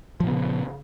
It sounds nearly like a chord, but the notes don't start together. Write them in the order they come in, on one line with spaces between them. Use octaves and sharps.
F3 A#2 B3 C#3